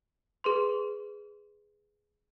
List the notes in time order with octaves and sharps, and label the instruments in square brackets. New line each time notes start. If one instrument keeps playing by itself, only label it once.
[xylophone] G#4 B4 C6